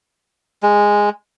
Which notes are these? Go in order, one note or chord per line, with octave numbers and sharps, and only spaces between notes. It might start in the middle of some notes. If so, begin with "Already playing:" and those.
G#3